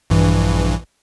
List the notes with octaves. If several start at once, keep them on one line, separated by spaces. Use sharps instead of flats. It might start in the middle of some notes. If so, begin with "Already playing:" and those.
A#1 G2 E3